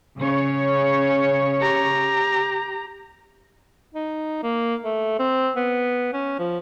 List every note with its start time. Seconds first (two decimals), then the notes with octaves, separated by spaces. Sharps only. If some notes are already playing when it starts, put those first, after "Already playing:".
0.18 C#3 C#5
1.61 G4 A#5
3.94 D#4
4.43 A#3
4.83 A3
5.19 C4
5.56 B3
6.13 C#4
6.39 F3